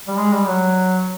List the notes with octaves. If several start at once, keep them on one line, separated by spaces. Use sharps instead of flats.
G3
G#3
G3
F#3